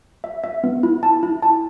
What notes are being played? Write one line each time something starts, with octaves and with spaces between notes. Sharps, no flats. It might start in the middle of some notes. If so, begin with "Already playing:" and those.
E5
E5
B3
E4
A5
E4
A5